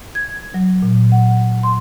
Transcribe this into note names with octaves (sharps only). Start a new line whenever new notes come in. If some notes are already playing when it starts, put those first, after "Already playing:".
G#6
F#3
A#2
F#5
C6